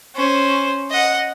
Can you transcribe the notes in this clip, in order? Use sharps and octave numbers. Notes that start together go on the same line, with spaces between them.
C#4 C5
D#5 F#5